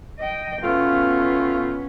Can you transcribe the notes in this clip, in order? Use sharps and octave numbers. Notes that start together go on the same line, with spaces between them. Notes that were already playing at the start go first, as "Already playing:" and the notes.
D#5 G5
B2 A3 B3 C#4 F4